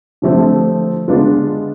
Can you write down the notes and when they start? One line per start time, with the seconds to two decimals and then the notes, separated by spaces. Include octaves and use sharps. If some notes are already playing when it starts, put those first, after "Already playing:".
0.22 D3 F3 A3 C4
1.08 D3 G#3 B3 D4 F4